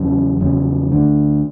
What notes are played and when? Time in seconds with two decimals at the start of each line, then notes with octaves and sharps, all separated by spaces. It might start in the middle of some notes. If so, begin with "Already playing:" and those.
Already playing: E2 C#3 F#3 C#4
0.40 E2 C#3 F#3 C#4
0.91 D2 D3 A3 D4